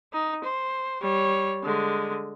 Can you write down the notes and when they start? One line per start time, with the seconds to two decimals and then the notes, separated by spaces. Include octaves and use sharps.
0.13 D#4
0.44 C5
1.01 G3 C#5
1.63 D3 G#3